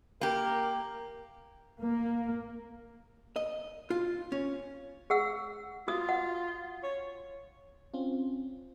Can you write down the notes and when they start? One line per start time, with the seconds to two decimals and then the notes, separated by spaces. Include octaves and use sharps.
0.21 A#3 G4 A#4
1.81 A#3
3.36 D#5
3.90 F4
4.32 C#4
5.10 G#4 F#5 E6
5.88 F4 F#4 D#6
6.09 F#5
6.83 C#5
7.94 C4 C#4 F4